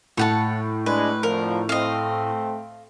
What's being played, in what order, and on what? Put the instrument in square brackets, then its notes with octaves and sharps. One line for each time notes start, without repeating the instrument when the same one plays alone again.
[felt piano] A2 [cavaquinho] C#5 F#5 A5
[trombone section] G#3 D4 [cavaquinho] B4
[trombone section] F2 D3 F3 [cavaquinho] A#4
[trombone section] A3 C4 [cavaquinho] D#5 F5